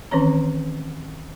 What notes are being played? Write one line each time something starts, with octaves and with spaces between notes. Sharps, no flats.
D#3 E3 C4 C#4 C#5 A#5